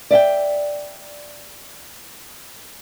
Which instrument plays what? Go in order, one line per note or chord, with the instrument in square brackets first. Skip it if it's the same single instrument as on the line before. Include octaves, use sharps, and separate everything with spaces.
[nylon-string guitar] D5 E5 F#5 G5